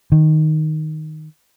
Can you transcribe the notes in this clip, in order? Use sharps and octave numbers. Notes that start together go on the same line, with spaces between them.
D#3